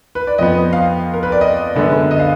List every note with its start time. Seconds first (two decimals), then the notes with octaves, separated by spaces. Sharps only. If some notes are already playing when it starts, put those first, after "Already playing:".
0.15 B4
0.27 D5
0.38 F2 F3 B3 D#5
0.73 F5
1.14 A#4
1.23 B4
1.32 D5
1.41 D#5
1.76 F#2 D3 G#3 B3
2.11 D#5
2.20 F5